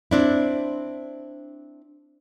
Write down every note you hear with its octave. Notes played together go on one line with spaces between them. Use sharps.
C4 D4 E4